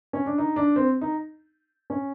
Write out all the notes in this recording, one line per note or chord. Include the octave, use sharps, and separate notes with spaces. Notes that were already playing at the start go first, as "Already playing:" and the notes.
C#4
D4
D#4
D4
C4
D#4
C#4